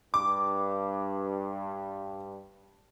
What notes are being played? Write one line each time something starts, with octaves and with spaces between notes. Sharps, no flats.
G2 D6